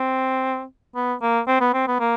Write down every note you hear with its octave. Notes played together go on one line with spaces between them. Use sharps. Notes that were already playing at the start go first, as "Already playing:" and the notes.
Already playing: C4
B3
A#3
C4
B3
C4
B3
A#3